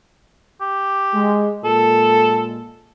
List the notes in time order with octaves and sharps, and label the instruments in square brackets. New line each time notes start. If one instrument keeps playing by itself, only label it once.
[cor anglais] G4
[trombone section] G#3
[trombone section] A#2 G#3 [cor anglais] A4